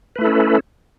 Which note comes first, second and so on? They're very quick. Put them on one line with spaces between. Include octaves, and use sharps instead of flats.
B4 A3 E4 A4 C#4